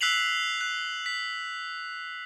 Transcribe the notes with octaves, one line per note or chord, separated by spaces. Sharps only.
E6 F#6 B6 C7 F7 F#7
F#6
B6